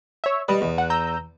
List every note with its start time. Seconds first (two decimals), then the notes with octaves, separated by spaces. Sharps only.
0.24 C#5 E5
0.48 G3 B4 D#5
0.61 E2
0.78 F#5
0.90 A#5 E6 G6